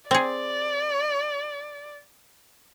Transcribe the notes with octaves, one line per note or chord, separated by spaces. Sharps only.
C4 G#4 D5